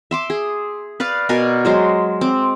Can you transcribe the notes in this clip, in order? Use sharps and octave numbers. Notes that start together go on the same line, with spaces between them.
E5 C6 D6
G#4
B4 D5 F5
B2 A#4 D5 G#5
F#3 G#3 C5
C4 D6